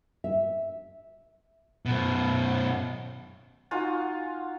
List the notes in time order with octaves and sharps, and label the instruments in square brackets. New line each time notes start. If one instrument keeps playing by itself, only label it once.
[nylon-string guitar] E5
[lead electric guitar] F#2 B2
[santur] D#4 F4 F#4 G#5